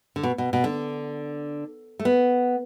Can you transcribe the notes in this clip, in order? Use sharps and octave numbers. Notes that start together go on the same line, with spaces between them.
D3
B2
B2
B2
D3
A3
B3